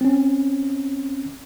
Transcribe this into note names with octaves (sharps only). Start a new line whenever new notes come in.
C4 C#4